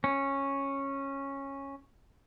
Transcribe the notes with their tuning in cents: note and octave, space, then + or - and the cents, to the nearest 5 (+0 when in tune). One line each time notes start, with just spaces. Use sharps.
C#4 -10